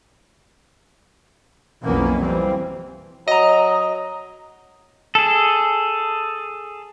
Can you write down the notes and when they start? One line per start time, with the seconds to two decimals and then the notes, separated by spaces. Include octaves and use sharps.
1.83 B1 F2 E3 A#3 B3 C#4
2.20 E3 F3 G3 C4
3.28 F#3 D#5 A#5
5.15 G#4 A4